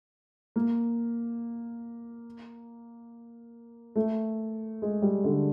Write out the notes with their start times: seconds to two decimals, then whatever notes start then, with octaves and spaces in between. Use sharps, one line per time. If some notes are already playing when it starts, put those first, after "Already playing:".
0.56 A#3
3.96 A3
4.82 G#3
5.02 G3
5.24 D3